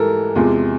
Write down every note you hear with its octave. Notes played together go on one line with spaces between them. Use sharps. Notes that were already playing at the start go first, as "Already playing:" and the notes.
Already playing: G#2 E3 G3 A4 A#4
E2 C3 F3 G#3